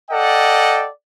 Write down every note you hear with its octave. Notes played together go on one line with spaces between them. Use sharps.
A4 D5 D#5 F#5 G5